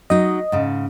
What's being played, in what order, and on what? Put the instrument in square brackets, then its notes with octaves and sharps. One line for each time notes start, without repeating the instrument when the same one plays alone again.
[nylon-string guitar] F#3 D#4 [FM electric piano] D#5
[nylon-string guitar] G#2 C#3